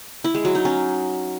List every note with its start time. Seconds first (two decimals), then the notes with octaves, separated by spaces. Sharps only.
0.24 E4
0.35 G#3
0.45 F#3
0.55 D#4
0.65 C#4